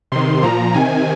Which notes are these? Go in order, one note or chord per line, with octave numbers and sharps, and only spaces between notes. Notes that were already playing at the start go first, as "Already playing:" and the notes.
C3 D#3 C6
A#2 F3 A#5
C3 D#3 G#5